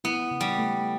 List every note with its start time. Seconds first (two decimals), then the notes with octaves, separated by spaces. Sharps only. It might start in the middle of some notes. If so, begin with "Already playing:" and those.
0.04 B3 E4
0.31 C#3
0.41 G3
0.58 A3